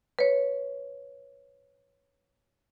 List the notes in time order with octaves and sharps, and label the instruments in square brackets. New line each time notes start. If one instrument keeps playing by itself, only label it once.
[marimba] B4 C#5